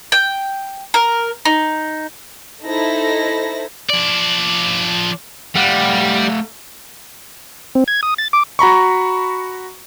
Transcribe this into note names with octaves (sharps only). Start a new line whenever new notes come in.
G5
A#4
D#4
D#4 E4 A4 C5 A#6
F3 D5
G3 A3 F5 F#5
C4
G#6
D#6
A6
D6
F#4 A#5 B5 C#6